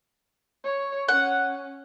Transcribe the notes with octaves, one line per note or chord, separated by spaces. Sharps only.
C#5
C#4 F#5